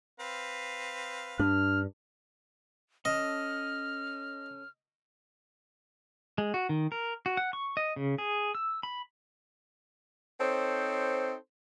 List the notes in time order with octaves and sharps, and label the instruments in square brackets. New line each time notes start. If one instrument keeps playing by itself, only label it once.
[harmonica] C4 B4 F5
[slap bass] G2 [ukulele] D4 [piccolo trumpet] F6
[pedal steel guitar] C#4 A4 A5 [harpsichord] D#5 [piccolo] F6
[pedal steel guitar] G#3
F#4
D#3
A#4
F#4
F#5
C#6
D#5
C#3
G#4
E6
B5
[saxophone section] C4 D#4 A4 C5 C#5